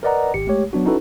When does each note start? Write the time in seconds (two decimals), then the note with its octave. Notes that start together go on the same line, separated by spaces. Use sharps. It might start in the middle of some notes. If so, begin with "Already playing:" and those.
0.03 A#4 B4 D5 D#5 F#5 A#5
0.34 G#1 G4 C#7
0.47 G#3 A3 G4 C#5
0.73 F#3 B3 D4 F#4
0.85 C#4 D#4 E4 F#4 A4 B4